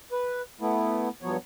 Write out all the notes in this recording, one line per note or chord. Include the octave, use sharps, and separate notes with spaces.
B4
A3 B3 E4
G2 F3 F#3 B3 C#5